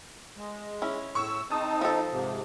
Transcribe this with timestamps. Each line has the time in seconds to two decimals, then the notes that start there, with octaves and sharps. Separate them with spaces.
0.37 G#3
0.82 C#4 E4
1.15 A2 C#6 E6
1.51 C4 D#4 A5 D#6
1.81 F3 A4
2.12 G#2 C3